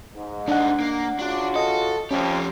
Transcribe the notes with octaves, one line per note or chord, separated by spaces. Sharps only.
G#2
A#2 D4 D#4 F#5
A#3
C#3 D4 F4 F#4
A4 D#5
F2 F3 C#4 G4